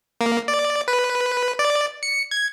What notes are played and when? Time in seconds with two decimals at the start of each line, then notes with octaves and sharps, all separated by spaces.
0.21 A#3
0.48 D5
0.88 B4
1.59 D5
2.03 C#7
2.31 G#6